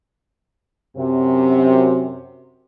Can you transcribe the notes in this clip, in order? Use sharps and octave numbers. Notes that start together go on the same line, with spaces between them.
F#2 C3